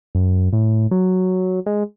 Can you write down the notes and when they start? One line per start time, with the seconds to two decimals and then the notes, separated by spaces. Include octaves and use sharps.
0.15 F#2
0.53 A2
0.91 F#3
1.66 G#3